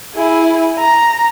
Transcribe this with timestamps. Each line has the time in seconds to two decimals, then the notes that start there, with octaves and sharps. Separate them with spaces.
0.15 E4 G#4
0.78 A#5